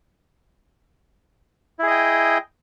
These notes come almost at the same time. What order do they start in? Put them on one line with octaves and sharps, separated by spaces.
E4 G#4 D#5 G5